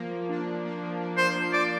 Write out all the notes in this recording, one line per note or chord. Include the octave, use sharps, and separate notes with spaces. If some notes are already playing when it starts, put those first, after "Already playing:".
Already playing: F3 A#3
F3
D4
F3
A#3
F3
D4
F3 C5
A#3
F3 D5